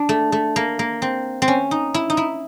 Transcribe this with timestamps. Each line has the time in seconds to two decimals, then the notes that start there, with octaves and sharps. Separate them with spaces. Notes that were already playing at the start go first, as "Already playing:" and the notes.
Already playing: D4
0.09 A3
0.32 A3
0.56 A#3
0.79 A#3
1.02 C4
1.42 C4
1.48 C#4
1.71 D#4
1.94 E4
2.10 D#4
2.17 E4